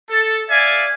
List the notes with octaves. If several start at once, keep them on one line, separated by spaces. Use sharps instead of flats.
A4
D5 E5 F5 G#5